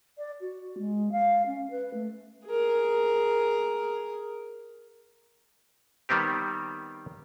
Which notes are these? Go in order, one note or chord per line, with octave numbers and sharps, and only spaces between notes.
D5
F#4
G#3
F5
C#4
B4
A3
G#4 A#4
D#3 G3 B3 C4 G4